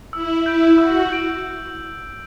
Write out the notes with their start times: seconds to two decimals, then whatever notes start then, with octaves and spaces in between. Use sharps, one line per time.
0.13 E4 E6
0.45 E4 G6 D7
0.77 F#4 E6
1.10 G6 D7